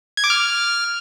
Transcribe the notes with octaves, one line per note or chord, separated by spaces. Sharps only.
G#6
D6
F6